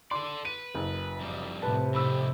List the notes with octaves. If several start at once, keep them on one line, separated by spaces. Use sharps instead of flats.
A4 D5 C6
B4 D#7
F#1
F2 G3
A2 C3 B4 A5
F2 A3 B5 E6